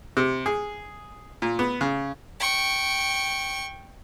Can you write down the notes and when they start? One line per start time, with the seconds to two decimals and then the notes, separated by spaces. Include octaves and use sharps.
0.17 C3
0.46 G#4
1.42 A#2
1.59 B3
1.81 C#3
2.40 G5 C#6